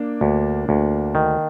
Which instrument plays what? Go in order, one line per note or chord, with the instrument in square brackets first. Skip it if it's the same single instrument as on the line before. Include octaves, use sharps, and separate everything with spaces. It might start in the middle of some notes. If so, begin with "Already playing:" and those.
Already playing: [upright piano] A#3 D4
[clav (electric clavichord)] D2
D2
D#3